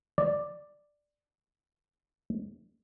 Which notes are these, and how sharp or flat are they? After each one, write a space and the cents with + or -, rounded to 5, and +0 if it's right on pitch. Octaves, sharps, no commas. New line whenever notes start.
D5 +5